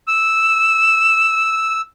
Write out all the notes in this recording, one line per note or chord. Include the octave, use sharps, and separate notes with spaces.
E6 E7